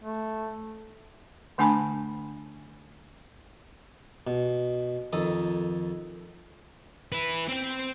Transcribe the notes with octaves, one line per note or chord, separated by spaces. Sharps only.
A3
D3 A3 D4 G#5 A5 B5
B2
F2 D#3 A4 D#6
E4 B4
C4 G5